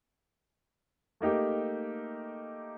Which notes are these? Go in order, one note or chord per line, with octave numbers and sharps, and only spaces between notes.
A3 A#3 D#4 G4